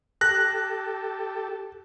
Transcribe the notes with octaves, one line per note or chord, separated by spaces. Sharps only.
G4 A4 F#6 A#6